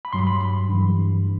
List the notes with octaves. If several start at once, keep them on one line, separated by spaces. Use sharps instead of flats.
B5
G2 F#3 C6
B5
G2 E3